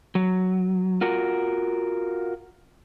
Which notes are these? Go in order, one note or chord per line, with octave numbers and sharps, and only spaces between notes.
F#3
F4 F#4 A#4